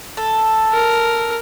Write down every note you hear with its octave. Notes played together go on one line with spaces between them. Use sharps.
A4
A#4